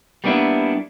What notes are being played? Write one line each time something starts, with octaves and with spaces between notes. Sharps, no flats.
G3 A#3 B3 D4 E4